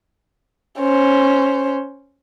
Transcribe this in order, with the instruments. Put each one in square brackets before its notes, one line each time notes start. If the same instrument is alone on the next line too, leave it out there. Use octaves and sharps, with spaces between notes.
[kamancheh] C#4 C5